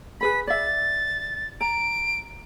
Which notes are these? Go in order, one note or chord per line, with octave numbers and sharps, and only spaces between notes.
G#4 B4 B5 B6
D5 E5 A6
A#5 D7